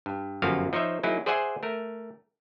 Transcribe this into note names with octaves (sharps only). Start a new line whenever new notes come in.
G2
G1 F#2 F3 A#3 F#4 F5
F3 D#4 C5 C#5 E5
F#3 A#3 D#4 E4 G#4
G#4 C5 D5 E5 F#5 G#5
A3 A#4